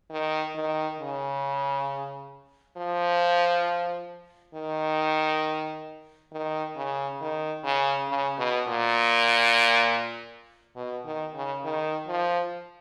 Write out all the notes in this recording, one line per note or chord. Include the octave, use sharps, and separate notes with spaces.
D#3
D#3
C#3
F3
D#3
D#3
C#3
D#3
C#3
C#3
B2
A#2
B2
D#3
C#3
D#3
F3